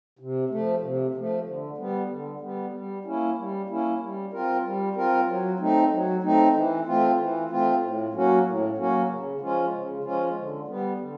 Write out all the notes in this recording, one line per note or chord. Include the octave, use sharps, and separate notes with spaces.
C3
F3 A3
C3
F3 A3
D3
G3 B3
D3
G3 B3
G3
A#3 C#4 E4
G3
A#3 C#4 E4
G3
C4 F4 A#4
G3
C4 F4 A#4
F#3
A3 C4 D#4
F#3
A3 C4 D#4
E3
A3 C4 F4
E3
A3 C4 F4
A2
F#3 A#3 C#4 F#4
A2
F#3 A#3 C#4 F#4
C#3
F3 G#3 C#4 F4
C#3
F3 G#3 C#4 F4
D3
G3 B3
D3